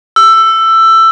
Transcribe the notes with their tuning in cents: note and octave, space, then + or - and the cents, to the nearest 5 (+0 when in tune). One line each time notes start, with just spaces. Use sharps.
E6 +15